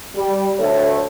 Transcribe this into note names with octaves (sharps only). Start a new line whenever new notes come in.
G3
D2 A3 A4 C#5